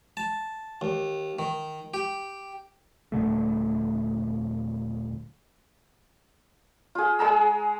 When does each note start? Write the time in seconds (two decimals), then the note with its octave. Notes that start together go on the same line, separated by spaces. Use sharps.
0.17 A5
0.81 D#2
1.39 D#3
1.94 G4
3.12 D#1 A#2 D3 A3
6.95 F4 G#4
7.19 G#3 G#4 A#5 E6